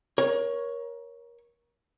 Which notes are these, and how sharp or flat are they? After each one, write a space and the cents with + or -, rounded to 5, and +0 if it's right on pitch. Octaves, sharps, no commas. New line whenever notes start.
A#4 +25 C#5 +0